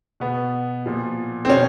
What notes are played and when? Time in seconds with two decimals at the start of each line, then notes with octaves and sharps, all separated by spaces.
0.20 B2 B3
0.86 A#2 F3
1.45 C4
1.49 B2 C#4